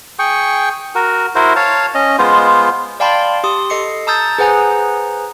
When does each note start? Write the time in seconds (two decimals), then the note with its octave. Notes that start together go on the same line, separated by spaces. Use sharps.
0.19 G#4 G5 C#6
0.95 F#4 A#4
1.35 E4 F#4 A#4 C5
1.56 C#5 F5 A5
1.95 C#4 D#5
2.19 G#3 B3 F4 C5
3.00 D5 F5 G5 A5 B5 C6
3.44 G4 C6 D#6
3.70 A4 D#5 C7 C#7
4.07 A5 A#5 D#6 E6 G6 A6
4.38 G#4 B4 C5 F#5 G#5 A#5